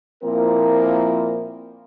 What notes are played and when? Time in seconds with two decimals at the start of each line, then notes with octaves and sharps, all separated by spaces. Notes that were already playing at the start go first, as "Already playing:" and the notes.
0.23 A#2 F3 A#3 C4 E4 A#4